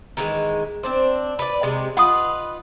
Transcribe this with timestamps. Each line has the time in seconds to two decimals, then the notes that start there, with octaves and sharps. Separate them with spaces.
0.17 D#3 E3 G#3
0.83 C4 D4 C5
1.39 B4 D5
1.63 C3 G#3 D#5
1.97 D#4 F4 B4 F#5 D#6